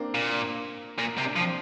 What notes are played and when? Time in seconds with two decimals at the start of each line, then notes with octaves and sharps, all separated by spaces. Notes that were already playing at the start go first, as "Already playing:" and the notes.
Already playing: A#3 C4 D4
0.15 A#2
0.98 A#2 A#4
1.18 C3
1.26 D4
1.36 F3
1.40 C4